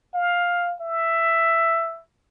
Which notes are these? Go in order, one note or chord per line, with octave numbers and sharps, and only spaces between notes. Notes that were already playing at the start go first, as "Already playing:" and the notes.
F5
E5